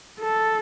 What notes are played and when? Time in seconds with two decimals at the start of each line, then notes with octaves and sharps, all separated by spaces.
0.19 A4